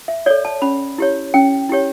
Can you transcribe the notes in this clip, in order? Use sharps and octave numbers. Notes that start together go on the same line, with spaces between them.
E5
A4 C#5 D5
A5
C#4 B5
E4 G4 C#5
C#4 G5
E4 G4 C#5